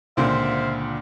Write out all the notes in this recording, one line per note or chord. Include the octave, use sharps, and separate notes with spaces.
C#2 A#2 D3 C4 E5 F5